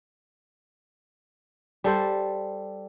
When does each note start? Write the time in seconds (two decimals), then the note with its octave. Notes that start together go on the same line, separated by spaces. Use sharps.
1.84 G3 A4 C5